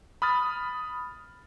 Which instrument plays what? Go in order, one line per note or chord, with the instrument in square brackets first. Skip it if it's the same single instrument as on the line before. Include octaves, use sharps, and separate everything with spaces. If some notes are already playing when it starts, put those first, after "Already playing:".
[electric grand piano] B5 D#6 F6 A6